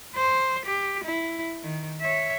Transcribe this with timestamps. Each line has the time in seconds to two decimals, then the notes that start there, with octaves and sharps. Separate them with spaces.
0.15 C5
0.66 G4
1.04 E4
1.63 D#3
2.01 C#5 E5